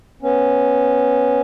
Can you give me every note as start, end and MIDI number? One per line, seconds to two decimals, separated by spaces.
0.22 1.41 59
0.22 1.41 61